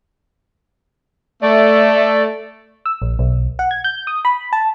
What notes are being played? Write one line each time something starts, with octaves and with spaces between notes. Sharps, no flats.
A3 D5
E6
A#1
B1
F#5
G#6
G6
D#6
B5
A5